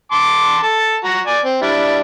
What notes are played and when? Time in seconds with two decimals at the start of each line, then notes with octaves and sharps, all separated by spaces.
0.12 A5 C6 D6
0.63 A4 A5
1.04 F#4 A#5
1.27 D5 G#5
1.45 C4
1.62 G3 D4 E4